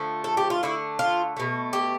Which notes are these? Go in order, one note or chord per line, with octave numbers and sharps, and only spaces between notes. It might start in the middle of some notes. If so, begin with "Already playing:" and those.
Already playing: D3 F3 A3
A4
G4
F4
D3 A3 E4
F4
B2 A3
G4